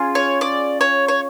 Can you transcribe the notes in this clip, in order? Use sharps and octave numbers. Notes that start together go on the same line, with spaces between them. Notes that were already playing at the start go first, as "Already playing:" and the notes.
Already playing: C#4 F4 G#4
C#5
D5
C#5
C#5